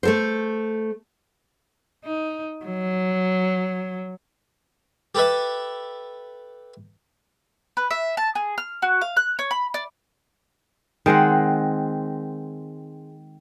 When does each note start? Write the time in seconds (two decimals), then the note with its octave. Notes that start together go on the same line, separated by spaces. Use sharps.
0.03 A3 A4 C5
2.04 D#4
2.66 F#3
5.15 G4 A4 B4 E5
7.77 B4
7.91 E5
8.17 A5
8.35 G#4
8.58 F6
8.82 F#4
9.01 F5
9.17 F#6
9.39 C#5
9.51 B5
9.74 D5
11.06 D#3 G#3 C4 F#5